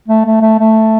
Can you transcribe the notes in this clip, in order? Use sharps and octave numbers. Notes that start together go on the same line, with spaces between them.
A3
A3
A3
A3